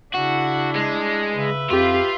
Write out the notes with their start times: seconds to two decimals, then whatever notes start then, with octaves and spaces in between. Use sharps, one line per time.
0.15 C#3 D4 E4 F#4
0.76 G#3
1.35 C#3 B4 E5
1.70 F2 F4 G4